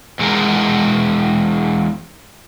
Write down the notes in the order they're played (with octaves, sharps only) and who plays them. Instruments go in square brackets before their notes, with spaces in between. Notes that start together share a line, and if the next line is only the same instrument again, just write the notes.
[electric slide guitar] E2 G#3 A#4